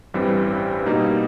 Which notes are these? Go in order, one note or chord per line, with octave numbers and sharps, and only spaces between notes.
A1 G2 E3 G3 C4
B2 G3 A#3 D#4